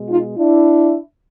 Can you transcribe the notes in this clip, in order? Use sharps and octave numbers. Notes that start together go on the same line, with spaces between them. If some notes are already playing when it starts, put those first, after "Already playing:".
Already playing: B2 G#3
D#4 F4
D4 E4